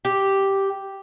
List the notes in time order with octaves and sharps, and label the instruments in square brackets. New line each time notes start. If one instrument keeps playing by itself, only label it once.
[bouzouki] G4